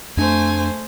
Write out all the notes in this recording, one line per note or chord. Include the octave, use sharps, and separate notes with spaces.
F2 A3 D4 C5 G#5